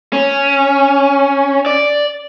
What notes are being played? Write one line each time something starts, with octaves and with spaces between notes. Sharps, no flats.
C#4
D5